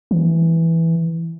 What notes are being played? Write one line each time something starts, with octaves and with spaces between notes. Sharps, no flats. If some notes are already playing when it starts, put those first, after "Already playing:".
E3